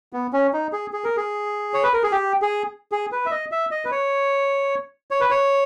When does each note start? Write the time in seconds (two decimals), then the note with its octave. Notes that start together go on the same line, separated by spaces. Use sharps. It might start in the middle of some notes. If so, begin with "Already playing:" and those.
0.13 B3
0.33 C#4
0.53 D#4
0.73 G#4
0.93 G#4
1.04 A#4
1.17 G#4
1.74 C#5
1.83 B4
1.93 A#4
2.03 G#4
2.12 G4
2.42 G#4
2.92 G#4
3.12 B4
3.26 E5
3.31 D#5
3.52 E5
3.71 D#5
3.85 B4
3.91 C#5
5.11 C#5
5.21 B4
5.31 C#5